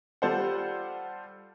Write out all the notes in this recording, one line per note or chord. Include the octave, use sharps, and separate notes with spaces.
G3 F4 A4 C5 D5 F#5